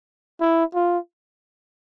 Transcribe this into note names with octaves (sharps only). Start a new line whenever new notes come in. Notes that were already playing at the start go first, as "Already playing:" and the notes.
E4
F4